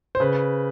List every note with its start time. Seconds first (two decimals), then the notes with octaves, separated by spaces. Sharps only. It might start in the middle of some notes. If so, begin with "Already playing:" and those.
0.15 C5
0.20 C#3 B4